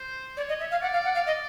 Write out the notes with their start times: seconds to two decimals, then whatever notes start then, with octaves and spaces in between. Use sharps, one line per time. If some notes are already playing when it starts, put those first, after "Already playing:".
Already playing: C5
0.37 C#5 D5
0.49 D#5
0.60 E5
0.71 F5
0.82 D5 F#5
0.93 F5
1.05 F#5
1.15 F5
1.27 D#5